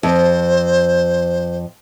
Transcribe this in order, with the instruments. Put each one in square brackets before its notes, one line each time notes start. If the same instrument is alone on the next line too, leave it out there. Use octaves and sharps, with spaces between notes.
[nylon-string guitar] F2 [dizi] C5